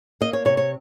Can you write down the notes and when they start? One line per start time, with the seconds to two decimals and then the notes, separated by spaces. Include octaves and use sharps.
0.21 A#3 D#5
0.33 C#5
0.45 C3 C#5
0.57 C#5